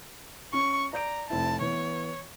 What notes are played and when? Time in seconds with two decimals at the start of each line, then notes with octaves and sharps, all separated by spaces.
0.53 C#4 C#6
0.93 D5 A#5 G6 D7
1.30 F1 C4 E4 A5
1.61 E3 B3 C#5